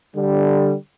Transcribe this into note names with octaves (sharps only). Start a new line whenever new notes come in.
D3 G3